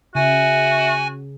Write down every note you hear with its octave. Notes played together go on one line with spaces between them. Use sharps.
C#3 F#4 E5 G#5